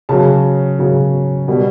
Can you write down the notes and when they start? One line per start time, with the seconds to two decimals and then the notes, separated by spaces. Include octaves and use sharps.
0.09 C#3 F#3 A5
0.79 C#3 F#3
1.48 B2 G3